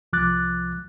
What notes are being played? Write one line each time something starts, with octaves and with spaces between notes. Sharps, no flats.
C2 F3 D6 F#6 A6